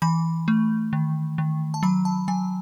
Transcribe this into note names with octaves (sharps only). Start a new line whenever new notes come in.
E3 B5
A3
D#3
D#3
A5
F#3 B5
A5
F#3 G#5